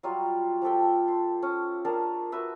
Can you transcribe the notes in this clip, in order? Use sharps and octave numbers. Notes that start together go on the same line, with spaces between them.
F#3 G3 F4
F3 G4 A4 G5
C6
C#4
D4 G#4 A#4 A5
F#4 B4 E5